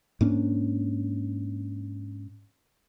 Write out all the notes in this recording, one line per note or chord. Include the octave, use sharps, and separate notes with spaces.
G#2 A#3 C#4 D4